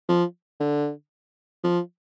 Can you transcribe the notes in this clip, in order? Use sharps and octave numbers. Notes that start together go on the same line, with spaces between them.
F3
D3
F3